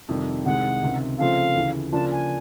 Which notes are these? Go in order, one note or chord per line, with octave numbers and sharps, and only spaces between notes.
F2 C3 D#3 G3
C2 C3 D#3 G#3 F#5
C#2 C3 D#3
C#3 F3 A3 C4 F4 F5
D2 C#3 E3
C#3 F3 A#3 D4 F4 A5
G#5